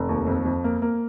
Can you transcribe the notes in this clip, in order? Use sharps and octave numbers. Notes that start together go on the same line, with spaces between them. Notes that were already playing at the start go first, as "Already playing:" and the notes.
Already playing: F1
D#2
F2
F2
A#3
A#3